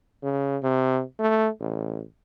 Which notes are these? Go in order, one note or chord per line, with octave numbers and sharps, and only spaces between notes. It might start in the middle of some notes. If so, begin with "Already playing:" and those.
C#3
C3
A3
A1